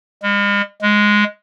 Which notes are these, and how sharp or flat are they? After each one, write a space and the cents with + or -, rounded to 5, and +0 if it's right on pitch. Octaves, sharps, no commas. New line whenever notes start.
G#3 -45
G#3 +0